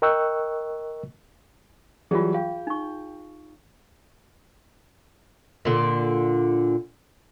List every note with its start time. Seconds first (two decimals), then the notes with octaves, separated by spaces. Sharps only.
0.02 A#4 D#5 G5 C#6 E6 F#6
2.11 E3 F#3 G3 F4 G#4
2.34 F5 G5
2.67 D#4 C#6
5.65 A#2 D3